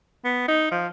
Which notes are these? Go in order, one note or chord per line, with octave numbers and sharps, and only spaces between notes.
B3
D#4
F3